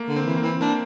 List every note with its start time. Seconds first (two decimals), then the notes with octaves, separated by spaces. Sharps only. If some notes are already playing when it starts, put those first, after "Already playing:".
Already playing: A3 A#3
0.08 D3
0.16 C4
0.25 E3
0.37 A#3
0.43 E3 C4
0.61 A#3 D4